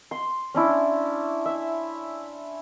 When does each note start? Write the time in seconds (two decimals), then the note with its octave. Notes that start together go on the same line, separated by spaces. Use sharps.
0.11 C6
0.54 C#4 D4 E4
1.46 E5